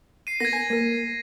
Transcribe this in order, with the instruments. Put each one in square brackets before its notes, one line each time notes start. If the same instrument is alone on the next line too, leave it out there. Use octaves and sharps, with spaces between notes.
[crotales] C7 D#7
[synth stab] A#3 B3 [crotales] G#6 A#6
[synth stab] G#5
A#3 A#4